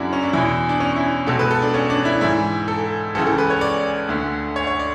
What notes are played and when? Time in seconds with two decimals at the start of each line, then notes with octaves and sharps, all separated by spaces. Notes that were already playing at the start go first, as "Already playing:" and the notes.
Already playing: F#2 C#3 D4 E4 F#4
0.13 C#4
0.23 D4
0.33 E2 B2 E4
0.69 D4
0.80 C#4
0.96 E4
1.27 C#2 B2 A4
1.39 B4
1.51 A4
1.63 D4
1.74 C#4
1.90 D4
2.05 E4
2.21 G#2 E3 E4
2.68 A4
3.15 C#2 C#3 E3 A4
3.27 A4
3.38 B4
3.50 C#5
3.61 D5
4.09 D2 D3
4.56 C#5
4.67 C#5
4.79 D5